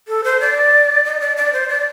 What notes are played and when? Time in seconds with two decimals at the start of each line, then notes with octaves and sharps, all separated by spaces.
0.08 A4
0.24 C5
0.40 D5
1.05 D#5
1.21 D5
1.37 D5
1.53 C5
1.69 D5